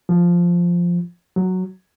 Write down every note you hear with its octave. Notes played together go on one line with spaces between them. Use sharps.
F3
F#3